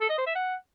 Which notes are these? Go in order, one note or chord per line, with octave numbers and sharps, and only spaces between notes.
A4
D#5
C5
E5
F#5